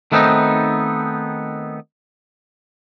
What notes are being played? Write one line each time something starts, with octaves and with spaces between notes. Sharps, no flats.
D#3 A3 B3 C4 D4 D#4